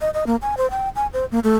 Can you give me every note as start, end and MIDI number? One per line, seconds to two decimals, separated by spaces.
0.01 0.10 75
0.14 0.25 75
0.27 0.36 58
0.42 0.55 80
0.57 0.69 72
0.71 0.89 79
0.96 1.07 80
1.13 1.25 72
1.32 1.39 58
1.44 1.57 57